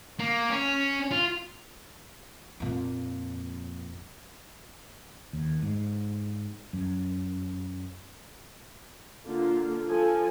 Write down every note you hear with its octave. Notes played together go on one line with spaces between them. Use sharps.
A#3
C#4
F4
F2 A#2
D#2
G#2
F#2
D3 A#3 F4
F3 A4 G#5